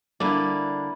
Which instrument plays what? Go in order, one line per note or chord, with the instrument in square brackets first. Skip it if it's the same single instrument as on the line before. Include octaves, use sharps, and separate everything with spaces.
[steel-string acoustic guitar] D3 G3 A#3 [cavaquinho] E4 B4 D5